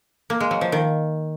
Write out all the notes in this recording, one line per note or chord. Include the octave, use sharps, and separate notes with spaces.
A#3
G#3
F#3
F3
D#3